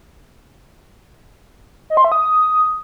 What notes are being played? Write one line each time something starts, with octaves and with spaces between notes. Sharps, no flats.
D#5
C6
E5
D#6